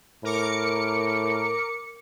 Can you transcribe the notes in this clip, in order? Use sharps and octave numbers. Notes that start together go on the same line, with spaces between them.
A2 A#4 D6 C#7